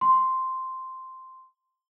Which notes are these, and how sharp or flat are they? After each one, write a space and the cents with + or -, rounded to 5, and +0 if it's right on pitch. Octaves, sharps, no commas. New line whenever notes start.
C6 -5